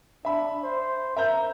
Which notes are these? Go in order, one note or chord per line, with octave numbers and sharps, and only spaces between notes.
D4 E5 B5
C5
A#4 E5 A#5 G6